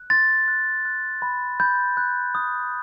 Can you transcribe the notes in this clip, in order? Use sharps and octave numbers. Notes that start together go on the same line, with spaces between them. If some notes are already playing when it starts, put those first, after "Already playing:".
Already playing: F#6
C6 A6
F#6
F#6
B5
B5 G6
F#6
D#6